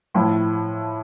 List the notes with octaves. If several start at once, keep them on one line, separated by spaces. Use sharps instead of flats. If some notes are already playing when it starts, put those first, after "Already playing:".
A2 F3 A3 E4